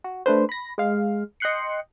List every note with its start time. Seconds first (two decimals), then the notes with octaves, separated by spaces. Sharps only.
0.04 F#4
0.26 A3 D4 B4 C5
0.49 B5 A#6
0.78 G#3 F5
1.40 D#5 G5 C6 F#6 C7 C#7